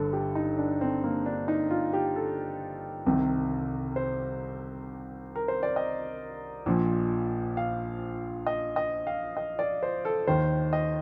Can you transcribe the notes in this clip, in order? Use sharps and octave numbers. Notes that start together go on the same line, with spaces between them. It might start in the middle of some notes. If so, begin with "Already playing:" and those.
Already playing: G1 G2 D3 A4
G4
D#4
D4
C4
A#3
D4
D#4
F4
G4
A4
C2 C3 D#3
C5
A#4
C5
D5
D#5
A#1 A#2 F3
F5
D#5
D#5
F5
D#5
D5
C5
A4
D#2 D#3 C5
D#5